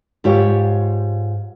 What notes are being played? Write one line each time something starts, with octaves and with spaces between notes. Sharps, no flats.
G#2 F4 G4 C#5